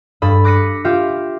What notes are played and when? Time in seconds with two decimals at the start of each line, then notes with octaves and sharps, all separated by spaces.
0.22 G2 A4 B5 D#6
0.44 D6 F#6 A#6 B6 C#7 D#7
0.85 F4 G4 E5 G5 D6